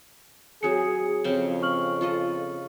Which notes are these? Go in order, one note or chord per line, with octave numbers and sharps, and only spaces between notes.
F#3 C4 F#4 G#4 C#7
F2 C#3 C4 C#4
C#6 F6 F#7
F4 A4 D#5